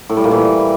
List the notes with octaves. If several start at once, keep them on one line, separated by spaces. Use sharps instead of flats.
A2
G3
A#2
E3